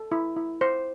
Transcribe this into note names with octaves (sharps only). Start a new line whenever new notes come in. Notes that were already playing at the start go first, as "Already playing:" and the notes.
Already playing: A4
E4
E4
C5